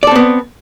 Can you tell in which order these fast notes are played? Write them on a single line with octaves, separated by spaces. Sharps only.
D5 A4 C4 B3